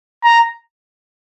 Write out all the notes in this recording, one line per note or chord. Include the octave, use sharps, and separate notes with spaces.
A#5